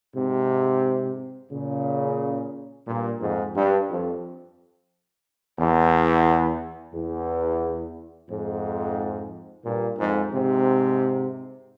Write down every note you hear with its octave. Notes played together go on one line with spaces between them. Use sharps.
G#2 C3
A#2 C#3
G2 A#2
F2 G#2
G2
F2
E2
E2
F2 G#2
G2 A#2
F2 G#2
G#2 C3